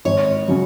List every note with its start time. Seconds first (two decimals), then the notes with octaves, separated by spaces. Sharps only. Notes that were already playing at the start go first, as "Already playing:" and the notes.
0.05 G#1 C#5
0.48 C#3 F#3